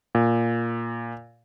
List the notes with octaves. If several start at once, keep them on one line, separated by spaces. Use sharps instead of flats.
A#2